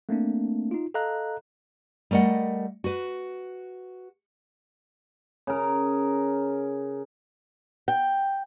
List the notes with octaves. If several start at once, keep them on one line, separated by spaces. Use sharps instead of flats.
A3 A#3 C4 D4
D#4 F4
A4 D#5 F5 A#5 F#6
G3 A3 A#4 D#5 F#5
F#4 B4
C#3 A#4
G5